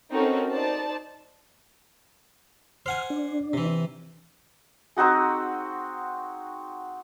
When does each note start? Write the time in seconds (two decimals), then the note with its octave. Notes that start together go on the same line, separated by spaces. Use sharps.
0.13 C4 C#4 D#4 F#4 A4 A#4
0.52 D#4 C5 D5 A5
2.86 C5 F#5 G#5 F6
3.10 D4
3.53 C3 E3
4.97 C4 D#4 F#4 G#4